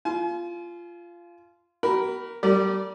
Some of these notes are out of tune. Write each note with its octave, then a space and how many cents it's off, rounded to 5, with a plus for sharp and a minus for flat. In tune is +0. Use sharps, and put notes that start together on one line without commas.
F4 -15 G#5 +40
F#4 +45 A#4 +0 B5 +0
G3 -30 A#4 -35 D5 +0